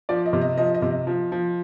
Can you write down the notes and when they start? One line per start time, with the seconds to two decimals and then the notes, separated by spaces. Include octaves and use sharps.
0.09 F3 D5
0.26 D#5
0.33 C3
0.41 D#5
0.57 F3 D#5
0.74 D#5
0.82 C3
0.91 D#5
1.07 F3
1.32 F3